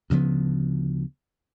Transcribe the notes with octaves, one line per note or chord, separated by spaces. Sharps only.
D2 C#3 F3 B3